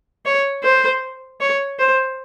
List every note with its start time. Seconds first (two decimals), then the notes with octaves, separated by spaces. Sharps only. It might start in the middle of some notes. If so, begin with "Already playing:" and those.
0.26 C#5
0.63 C5
1.41 C#5
1.79 C5